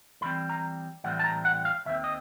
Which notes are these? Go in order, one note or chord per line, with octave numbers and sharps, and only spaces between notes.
A2 E3 G3 C4 B5
A#5
A2 E3 G3 C4 F#5
A5
A#5
F#5
F5
D#2 D#3 C4 E5
D#5